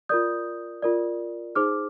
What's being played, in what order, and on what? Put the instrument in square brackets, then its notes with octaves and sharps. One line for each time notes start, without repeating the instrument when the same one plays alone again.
[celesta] F4 A#4 D5 D#6 G6
F4 A#4 D5
D#4 G#4 C5 D6 F6